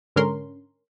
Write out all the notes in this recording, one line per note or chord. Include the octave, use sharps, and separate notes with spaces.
G#2 D3 C#4 A#4 C6